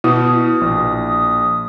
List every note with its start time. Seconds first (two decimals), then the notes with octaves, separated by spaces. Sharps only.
0.04 B2 E4 D#6
0.61 A#1